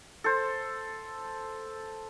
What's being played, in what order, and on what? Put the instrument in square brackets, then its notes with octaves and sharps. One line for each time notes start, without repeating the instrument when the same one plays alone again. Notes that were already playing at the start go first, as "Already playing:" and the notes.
[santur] A4 C5